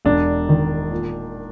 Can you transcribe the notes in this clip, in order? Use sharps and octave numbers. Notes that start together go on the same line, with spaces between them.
E1 D4
D#3
A#2